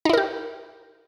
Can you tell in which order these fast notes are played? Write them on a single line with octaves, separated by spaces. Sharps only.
D#4 E4 A#4 G4